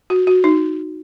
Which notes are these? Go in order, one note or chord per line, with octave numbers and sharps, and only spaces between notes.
F#4
F#4
D#4